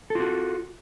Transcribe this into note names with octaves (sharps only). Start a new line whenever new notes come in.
F4 F#4 A4